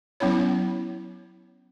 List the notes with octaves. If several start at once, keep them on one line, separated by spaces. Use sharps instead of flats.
F#3 B3 C#4 E4 C#5